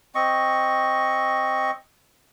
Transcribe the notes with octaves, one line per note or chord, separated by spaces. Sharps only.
C4 D#5 C#6